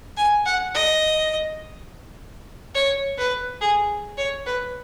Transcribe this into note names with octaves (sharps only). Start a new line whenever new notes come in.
G#5
F#5
D#5
C#5
B4
G#4
C#5
B4